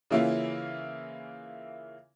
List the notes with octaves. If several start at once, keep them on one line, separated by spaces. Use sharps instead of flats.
C#3 E3 A#3 C#4 E4 F4